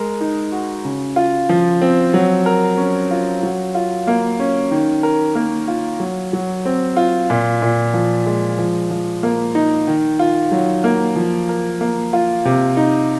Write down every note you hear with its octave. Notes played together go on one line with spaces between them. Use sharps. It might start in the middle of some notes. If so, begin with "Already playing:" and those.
Already playing: G#3 A#4
D#4
F#4
C#3
F4
F3
C4
F#3
A#4
C#4
F4
F#3
F4
A#3
C#4
D#3
A#4
A#3
F4
F#3
F#3
C4
F4
A#2
A#2
F3
G#3
F3
F3
A#3
D#4
D#3
F4
F#3
A#3
F3
A#4
A#3
F4
C3
D#4